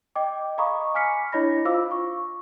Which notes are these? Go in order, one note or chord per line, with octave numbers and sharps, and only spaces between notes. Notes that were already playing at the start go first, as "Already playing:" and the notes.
D#5 G5 D6
D#5 F5 A#5 B5 C#6 D#6
G#5 D6 F6 B6 C#7
D4 E4 C#5 D#5 B5 A#6
F4 C5 F5 D6 E6
C#6